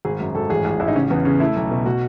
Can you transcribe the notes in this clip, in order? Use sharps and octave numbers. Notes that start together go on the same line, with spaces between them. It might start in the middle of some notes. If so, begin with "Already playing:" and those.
G#1 G#4
F#2 F#4
G#1 A4
A1 G#4
A1
A1 E4
D#4
C#3 C#4
E2 B3
C#3 C#4
A3 E4
B1
B2
B2 F#4